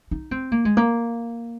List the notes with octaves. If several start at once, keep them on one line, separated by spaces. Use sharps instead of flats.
D#4
C4
A#3
G#3
A#3